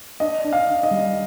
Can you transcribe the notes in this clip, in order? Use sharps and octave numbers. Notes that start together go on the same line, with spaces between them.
D4 D#5
D4
F5
D4
D#5
G3